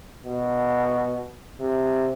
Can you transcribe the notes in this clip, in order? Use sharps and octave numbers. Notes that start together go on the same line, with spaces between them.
B2
C3